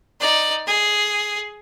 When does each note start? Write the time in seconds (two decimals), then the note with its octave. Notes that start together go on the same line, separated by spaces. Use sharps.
0.21 D#4 D5
0.67 G#4